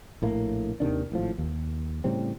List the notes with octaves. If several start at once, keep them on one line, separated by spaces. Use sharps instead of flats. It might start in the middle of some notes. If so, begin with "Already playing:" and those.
A#1 A2 A#3
D#2 C3 D#3 D4
G#1 A2 F3
D#2
A2 C#3 G3 C4